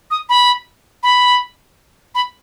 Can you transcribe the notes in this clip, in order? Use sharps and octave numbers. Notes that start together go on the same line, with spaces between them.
D#6
B5
B5
B5